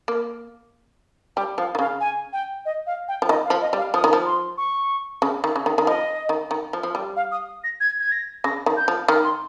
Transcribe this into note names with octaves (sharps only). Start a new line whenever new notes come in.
A#3
G3 G5
F3 F5
D#3
C#3 F5
G#5
G5
D#5
F5
G5
F3
D#3 D#5
F5
F3
D#5
G3
F5
F3 D#6
D#3
F3
C6
C#6
C#3
D#3
C#3
D#3
D#3
F3 D#5
D#3
D#3
F3
F3
G3
F5
D#6
A#6
G#6
G#6
A#6
C#3 A#6
D#3
G6
F3
D#3 F6
C6